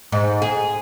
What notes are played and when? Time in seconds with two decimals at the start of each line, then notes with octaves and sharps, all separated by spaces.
0.12 G#2
0.42 G#4